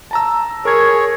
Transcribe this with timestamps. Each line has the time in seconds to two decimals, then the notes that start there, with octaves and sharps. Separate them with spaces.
0.11 A5 A#5 E6
0.65 G#4 A#4 C#5 G#6